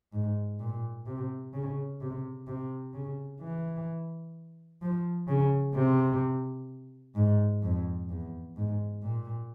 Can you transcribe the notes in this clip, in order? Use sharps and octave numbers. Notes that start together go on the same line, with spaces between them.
G#2
A#2
C3
C#3
C3
C3
C#3
E3
F3
C#3
C3
G#2
F2
E2
G#2
A#2